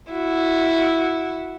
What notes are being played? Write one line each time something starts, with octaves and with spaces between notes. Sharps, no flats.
E4 F#4